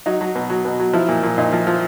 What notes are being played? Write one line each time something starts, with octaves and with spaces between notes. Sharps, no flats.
F#3 D#4
F#3
B2
F#3
B2
F#3
F3 E4
A#2
A#2
A#2 D#4
F3
F3